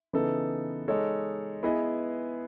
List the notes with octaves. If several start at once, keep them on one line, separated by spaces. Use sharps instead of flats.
C#3 E3 B3 D#4 A4
G#3 D#4 A4 C#5
B3 E4 G#4 B4 D#5